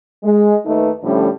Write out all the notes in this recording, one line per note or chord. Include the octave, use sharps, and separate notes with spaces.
G#3
D#2 A3 D#4 B4
A2 D3 F3 G3 A3 C#4